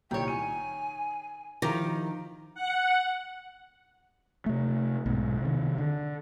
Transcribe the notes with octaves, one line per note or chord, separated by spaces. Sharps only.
C2 A#2 D#3 C#5 G5
G#5 D#7
D#3 F3 E4 F4 G4 A#5
F#5
C3 A3
B1 G#2
C3 D#3
D3